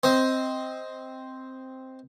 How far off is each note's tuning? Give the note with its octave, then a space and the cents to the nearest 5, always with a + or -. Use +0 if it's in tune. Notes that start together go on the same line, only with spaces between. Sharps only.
C4 +0 C5 +0 D#5 +15